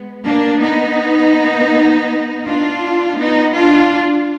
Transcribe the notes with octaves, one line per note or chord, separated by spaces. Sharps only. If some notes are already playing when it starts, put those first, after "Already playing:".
Already playing: G#3 B3
A#3 D4
B3 D#4
D4 F4
B3 D#4
D4 F4